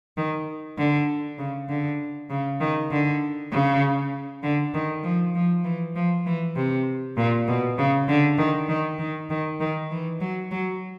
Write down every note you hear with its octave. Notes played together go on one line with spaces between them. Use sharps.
D#3
D3
C#3
D3
C#3
D#3
D3
C#3
D3
D#3
F3
F3
E3
F3
E3
C3
A#2
B2
C#3
D3
D#3
D#3
D#3
D#3
D#3
E3
F#3
F#3